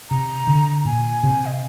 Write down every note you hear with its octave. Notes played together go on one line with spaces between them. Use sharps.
C3 A#5
D3
A#2 G#5
C3
D#5
F5